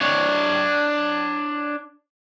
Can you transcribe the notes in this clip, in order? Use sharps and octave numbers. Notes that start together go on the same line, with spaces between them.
D4 C#5